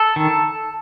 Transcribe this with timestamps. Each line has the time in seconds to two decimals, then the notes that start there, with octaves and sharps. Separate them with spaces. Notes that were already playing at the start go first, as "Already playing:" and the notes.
Already playing: A4
0.16 D#3